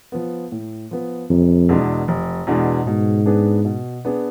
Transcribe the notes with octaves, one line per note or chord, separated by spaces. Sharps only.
F3 B3
A2
F3 B3
F1 F2
E2 B2 G#3 D4
F1
E2 B2 G#3 D4
G#2 B2
B3 D4 G#4 B4
B2
B3 D4 G#4 B4